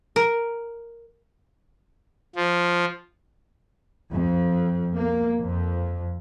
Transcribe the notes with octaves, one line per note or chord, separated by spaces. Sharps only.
A#4
F3
F2
A#3
F2